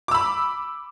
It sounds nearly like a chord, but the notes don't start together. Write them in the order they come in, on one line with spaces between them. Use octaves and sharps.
D6 E6 B5